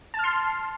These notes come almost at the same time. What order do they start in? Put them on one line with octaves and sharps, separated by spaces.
A5 F6 C6